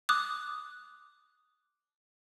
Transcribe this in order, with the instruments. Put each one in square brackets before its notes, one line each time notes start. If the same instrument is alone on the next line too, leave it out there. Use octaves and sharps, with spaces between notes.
[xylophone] D6 D#6 F#6